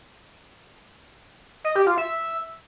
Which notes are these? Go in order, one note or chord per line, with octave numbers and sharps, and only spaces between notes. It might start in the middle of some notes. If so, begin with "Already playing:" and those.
D#5
G4
F4
E5